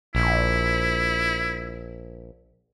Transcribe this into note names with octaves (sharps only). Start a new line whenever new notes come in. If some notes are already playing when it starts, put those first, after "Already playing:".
A#1 E4